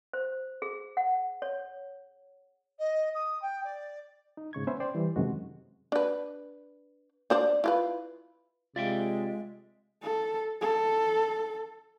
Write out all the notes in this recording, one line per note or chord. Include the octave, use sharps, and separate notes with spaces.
C5
G#4
F#5
C#5
D#5
D#6
G5
D5
D#4
G#2 C#3 C#6 G#6
B3 C#4 B4 C5 E5
C5 D5 G5 C6
E3 G3
F#2 C3 D#3 G#3 F#4
D4 B4
D4 C5 D5
E4 F4 B4
C3 G#3 F4 D5 E5 G5
A4
A4